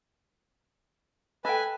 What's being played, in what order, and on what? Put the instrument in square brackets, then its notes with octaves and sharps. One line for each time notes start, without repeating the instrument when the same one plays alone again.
[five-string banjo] A4 [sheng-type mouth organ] B4 G#5 [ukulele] D#5 G5